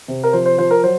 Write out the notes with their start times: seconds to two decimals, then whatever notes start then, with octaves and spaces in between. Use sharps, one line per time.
0.08 C3
0.24 A#4
0.33 F3 C5
0.46 C5
0.58 F3 C5
0.71 A#4
0.83 F#3 C5